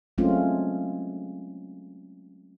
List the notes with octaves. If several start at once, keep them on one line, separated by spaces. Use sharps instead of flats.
F#3 G#3 A3 C4 C#4 F4